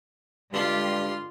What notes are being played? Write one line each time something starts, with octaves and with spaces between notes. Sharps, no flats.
G2 D3 G#3 F4 G4 C6